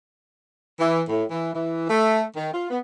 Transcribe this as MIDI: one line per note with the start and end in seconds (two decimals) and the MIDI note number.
0.79 1.02 52
1.08 1.24 45
1.31 1.51 52
1.53 1.86 52
1.90 2.24 57
2.35 2.49 51
2.54 2.70 65
2.70 2.78 59